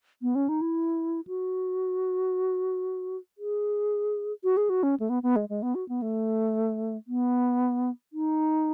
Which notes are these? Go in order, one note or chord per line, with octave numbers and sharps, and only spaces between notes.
B3
C#4
D#4
E4
F#4
G#4
F#4
G#4
F#4
C#4
A3
B3
B3
G#3
G#3
B3
F#4
B3
A3
B3
D#4